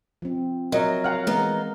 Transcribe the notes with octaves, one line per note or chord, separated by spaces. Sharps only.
F3 C4
F#3 A#4 D#5 E5
F5 F#5 F6
E3 G#3 B3 D#4